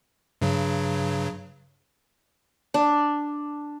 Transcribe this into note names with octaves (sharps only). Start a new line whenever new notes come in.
G2 C#3 F#3
D4